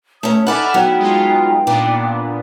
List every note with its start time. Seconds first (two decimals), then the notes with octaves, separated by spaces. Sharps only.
0.23 A3 C#4 C#5 E5 D#6
0.47 D#4 A4 D5 E5 F#5 G#5 B5 F6
0.74 F#3 B3 D#4 E4 G5
0.99 G#3 B3 F4
1.67 A#2 B3 D4 D5